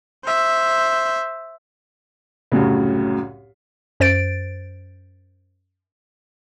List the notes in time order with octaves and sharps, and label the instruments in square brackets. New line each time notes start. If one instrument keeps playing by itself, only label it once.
[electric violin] C5 E5
[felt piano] C2 F#2 A2 C#3
[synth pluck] F#2 C5 A6 D7